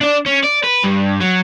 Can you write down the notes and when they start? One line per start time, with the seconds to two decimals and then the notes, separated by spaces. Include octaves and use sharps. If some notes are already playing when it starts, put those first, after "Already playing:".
0.01 D4 D5
0.26 C#4
0.44 D5
0.64 B4
0.84 G2
1.21 F#3